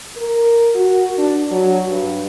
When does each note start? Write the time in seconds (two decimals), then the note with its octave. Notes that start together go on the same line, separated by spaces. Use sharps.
0.17 A#4
0.75 F#4
1.18 D4
1.51 F#3
1.88 G2